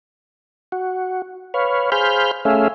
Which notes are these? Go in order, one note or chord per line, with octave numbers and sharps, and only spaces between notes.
F#4
B4 C#5 F5
G#4 C5 F5 B5 F6 G6
A3 C#4 G#4 E5 F5